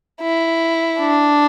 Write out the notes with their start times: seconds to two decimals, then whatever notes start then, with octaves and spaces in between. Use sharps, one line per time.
0.22 E4
1.00 D4